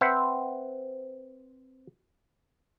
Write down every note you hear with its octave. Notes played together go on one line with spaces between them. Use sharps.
C4 B4 C5 E5 F#5